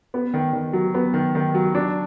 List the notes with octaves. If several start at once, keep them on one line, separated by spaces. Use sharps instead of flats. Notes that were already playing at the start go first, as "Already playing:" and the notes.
B3
D#3
D#3
F#3
B3
D#3
D#3
F#3
D4